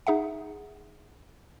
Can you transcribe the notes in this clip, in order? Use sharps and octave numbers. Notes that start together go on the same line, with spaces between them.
D#4 G#4 E5 F#5